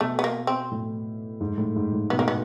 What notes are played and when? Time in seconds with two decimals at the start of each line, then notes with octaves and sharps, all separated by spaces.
0.01 B2 A3
0.19 B3
0.24 A#3
0.47 C4
0.71 A2
1.41 G#2
1.57 A2
1.76 G#2
1.93 A2
2.10 B2 B3
2.19 A#3
2.28 B3